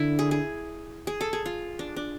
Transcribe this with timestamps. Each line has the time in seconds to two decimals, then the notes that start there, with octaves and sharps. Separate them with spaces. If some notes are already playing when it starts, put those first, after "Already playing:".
Already playing: D3 E4
0.19 G#4
0.31 G#4
1.07 G#4
1.21 A4
1.33 G#4
1.46 F4
1.79 D4
1.96 D4